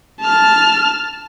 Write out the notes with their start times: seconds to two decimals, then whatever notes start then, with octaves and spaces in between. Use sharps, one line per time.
0.20 A5 F6